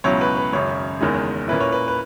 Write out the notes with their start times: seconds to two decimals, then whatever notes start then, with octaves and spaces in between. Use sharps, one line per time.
0.04 C#2 B2 F#3 C#4 E4 C#5
0.21 B4
0.37 B4
0.52 G#1 F#2 C#3 C#5
1.00 F#1 E2 D#3 G#3 C#4
1.48 A#2 A#3 C#4 E4 B4
1.60 C#5
1.72 B4
1.88 B4